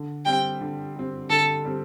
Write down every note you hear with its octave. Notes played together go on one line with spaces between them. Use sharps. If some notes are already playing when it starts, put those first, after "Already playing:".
Already playing: D3
G3 C4 G5
D3
G3 C4
D3 A4
G3 C4